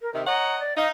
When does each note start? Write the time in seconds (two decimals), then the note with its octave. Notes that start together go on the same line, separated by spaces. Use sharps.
0.01 A#4
0.14 C3 D#3 E5
0.27 C#5 D#5 F#5 A#5
0.59 D5
0.76 D#4 F5